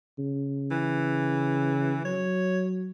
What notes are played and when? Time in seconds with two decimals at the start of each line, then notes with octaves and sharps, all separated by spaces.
0.19 C#3
0.71 E3
2.05 F#3 C#5